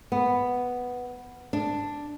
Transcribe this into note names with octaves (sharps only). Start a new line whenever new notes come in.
B3
D4